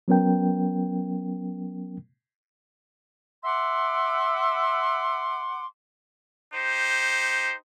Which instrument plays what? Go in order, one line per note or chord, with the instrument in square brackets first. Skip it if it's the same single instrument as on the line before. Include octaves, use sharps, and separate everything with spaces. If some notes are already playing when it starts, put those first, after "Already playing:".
[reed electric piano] F#3 B3 C#4 A#4 G5
[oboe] E5 [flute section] F#5 C6 D6
[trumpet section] D#4 G4 C5